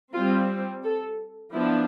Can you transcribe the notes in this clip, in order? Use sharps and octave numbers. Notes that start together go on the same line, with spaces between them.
G3 C4 F4
A4
F3 B3 D4 E4